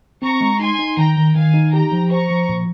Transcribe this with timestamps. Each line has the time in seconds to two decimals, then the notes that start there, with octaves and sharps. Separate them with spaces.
0.22 C4 A#5 C#6
0.41 G#3
0.60 D#4 G#5 C6
0.79 D#4
0.97 D#3 G5 A#5
1.17 D#3
1.35 D#3 F5 G#5
1.54 D#4
1.72 G4 G5 A#5
1.92 F3
2.10 C5 A#5 C#6
2.30 F3
2.49 A#2